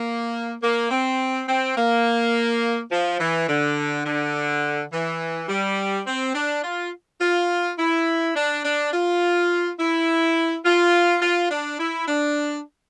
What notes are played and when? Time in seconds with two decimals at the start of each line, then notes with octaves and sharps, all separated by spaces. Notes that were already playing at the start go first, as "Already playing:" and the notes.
Already playing: A#3
0.63 A#3
0.91 C4
1.49 C4
1.77 A#3
2.91 F3
3.20 E3
3.49 D3
4.06 D3
4.92 E3
5.49 G3
6.07 C4
6.35 D4
6.64 F4
7.21 F4
7.79 E4
8.36 D4
8.65 D4
8.93 F4
9.79 E4
10.65 F4
11.22 F4
11.51 D4
11.79 E4
12.08 D4